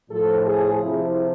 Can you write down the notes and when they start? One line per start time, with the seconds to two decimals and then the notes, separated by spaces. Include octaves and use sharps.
0.10 A2 F3 A4
0.46 G#4
0.80 C3 F3 E4